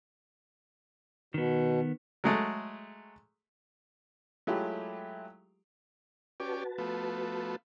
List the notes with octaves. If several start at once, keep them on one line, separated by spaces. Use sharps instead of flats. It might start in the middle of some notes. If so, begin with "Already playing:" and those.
B2 D#3 B3
F#3 G#3 A3
F#3 G#3 A3 E4 F4 G4
C#4 F#4 G4 B4 D5 A5
F3 A3 B3